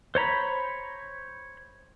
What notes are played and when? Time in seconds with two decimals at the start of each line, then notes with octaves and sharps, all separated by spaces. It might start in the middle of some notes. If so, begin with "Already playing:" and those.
0.15 C5 C#5 A#5 B5